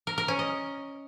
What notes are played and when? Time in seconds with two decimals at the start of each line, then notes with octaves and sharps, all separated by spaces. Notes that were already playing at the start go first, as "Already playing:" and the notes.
0.07 A#4
0.18 A#4
0.28 C#4
0.39 D#5